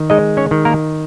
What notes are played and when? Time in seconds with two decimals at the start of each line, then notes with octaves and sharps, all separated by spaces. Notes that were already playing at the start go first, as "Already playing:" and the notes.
Already playing: D#3
0.10 G#3 D#4 D#5
0.37 C#4 C#5
0.51 D#3
0.65 A#3 A#4